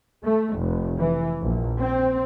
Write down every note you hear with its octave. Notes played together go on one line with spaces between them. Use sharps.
A3
F1
E3
A#1
C4